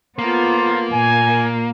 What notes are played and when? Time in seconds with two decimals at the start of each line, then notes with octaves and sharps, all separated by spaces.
0.19 A#3 B3 F4 A4 C5
0.92 A#2 G#5